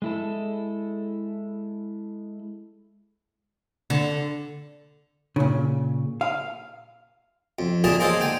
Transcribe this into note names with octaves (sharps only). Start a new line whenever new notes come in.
G#3 E4 A4
D3
A#2 C#3
F5
F2
A1 F2 A#2 G#4 A#4 A5
G#3 A#3 G#4 A4 C5 C#5
D3 G5 G#5